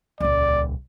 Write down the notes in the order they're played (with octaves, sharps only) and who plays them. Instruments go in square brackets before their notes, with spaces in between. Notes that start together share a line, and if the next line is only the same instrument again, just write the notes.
[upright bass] D#1 C#2 [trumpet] D5